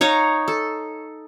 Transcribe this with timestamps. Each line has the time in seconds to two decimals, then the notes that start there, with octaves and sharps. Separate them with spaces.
0.01 D#4 C#5 F5 A#5
0.48 A4